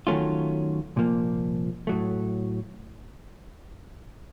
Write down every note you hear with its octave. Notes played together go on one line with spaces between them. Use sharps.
D#3 F#3 A3 C#4 F4
C2 A#2 F3 A#3
A2 F#3 A3